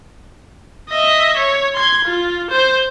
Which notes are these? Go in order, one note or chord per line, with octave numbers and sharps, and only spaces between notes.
D#5 E5
C#5
C6 G#6
F4
C5